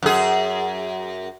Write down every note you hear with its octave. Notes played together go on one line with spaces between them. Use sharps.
F#2 G#4